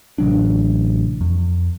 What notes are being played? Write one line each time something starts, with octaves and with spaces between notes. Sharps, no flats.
A1 C3 F#3 D4
F2